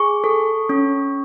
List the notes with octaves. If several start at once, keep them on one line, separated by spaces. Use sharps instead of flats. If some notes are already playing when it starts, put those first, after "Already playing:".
Already playing: G#4 C#6
A4
C#4